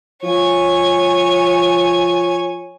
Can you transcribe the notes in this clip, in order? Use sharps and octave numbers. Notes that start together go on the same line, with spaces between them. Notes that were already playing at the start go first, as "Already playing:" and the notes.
F3 C#5 G#5